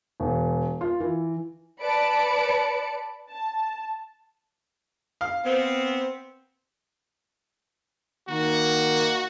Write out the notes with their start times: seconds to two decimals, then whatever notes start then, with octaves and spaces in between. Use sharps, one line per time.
0.20 E1
0.81 F4
1.00 E3
1.82 B4 D5 A5 B5 C#7 D7
3.30 A5
5.21 F5
5.45 B3 C4
8.28 D#3 A#3 F#4